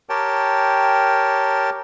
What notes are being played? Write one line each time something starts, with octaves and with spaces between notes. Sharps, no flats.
G4 A#4 C#5 G5 A5